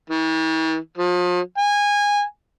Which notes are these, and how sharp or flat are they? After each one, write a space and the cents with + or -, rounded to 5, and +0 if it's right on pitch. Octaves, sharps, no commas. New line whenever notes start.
E3 -45
F3 +35
G#5 -20